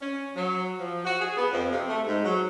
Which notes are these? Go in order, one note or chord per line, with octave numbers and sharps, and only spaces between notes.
C#4
F#3
F3
F#4
G#4
B3
F2
C3
A3
G#2
F#3